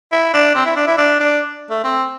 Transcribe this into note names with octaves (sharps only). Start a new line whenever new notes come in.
E4
D4
C4
E4
D4
E4
D4
D4
A3
C4